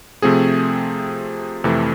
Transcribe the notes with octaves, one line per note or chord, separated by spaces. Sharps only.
C3 F3 A3 C4 G#4
F2 C3 E3 A3